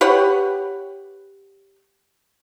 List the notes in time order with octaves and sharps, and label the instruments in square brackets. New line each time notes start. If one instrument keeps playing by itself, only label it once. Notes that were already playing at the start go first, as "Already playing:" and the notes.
[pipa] G4 B4 C#5 F#5